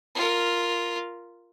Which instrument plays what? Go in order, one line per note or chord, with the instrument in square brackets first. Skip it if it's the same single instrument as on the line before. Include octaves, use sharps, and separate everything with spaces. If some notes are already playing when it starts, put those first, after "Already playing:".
[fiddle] F4 A#4